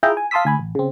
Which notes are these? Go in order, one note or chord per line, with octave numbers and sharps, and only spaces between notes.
E4 F4 G#4 E5 G5 A#5
G#5
F5 A5 C6 D#6 E6 B6
D2 G#5 B5
A1
C#3 C4